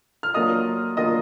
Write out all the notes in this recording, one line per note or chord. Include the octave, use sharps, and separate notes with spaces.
F6
F#3 A#3 D4 F4 D#5 D#6
F#3 A#3 D4 F4 D#5 D#6